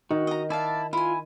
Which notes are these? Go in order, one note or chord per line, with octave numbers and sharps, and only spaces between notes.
D#3 F#4
D#5 A#5
E4 D5 F5 A5
E4 F4 G#5